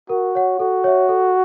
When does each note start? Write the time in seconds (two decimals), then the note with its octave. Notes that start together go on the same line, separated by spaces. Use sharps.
0.09 F#4 A#4
0.35 C#5 F#5
0.59 F#4 A4
0.84 C#5 E5
1.09 A4